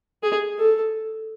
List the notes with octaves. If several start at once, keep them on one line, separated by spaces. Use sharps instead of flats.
G#4
A4